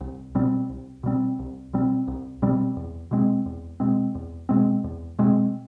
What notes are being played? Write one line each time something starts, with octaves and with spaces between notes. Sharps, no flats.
C2
B2 G3 C4
C2
B2 G3 C4
C2
B2 G3 C4
C2
B2 G3 C4
E2
B2 G#3 C4
E2
B2 G#3 C4
E2
B2 G#3 C4
E2
B2 G#3 C4